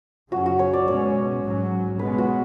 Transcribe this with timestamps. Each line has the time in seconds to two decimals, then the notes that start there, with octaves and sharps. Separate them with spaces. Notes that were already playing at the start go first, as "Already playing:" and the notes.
0.32 F#2 C#3 F#3 C#4 F#4
0.46 F#4
0.59 C#5
0.73 D5
0.87 B2 G#3 C#4 C#5
1.44 G#2 F#3 C#4
1.99 B2 G#3 B3 B4
2.18 F#4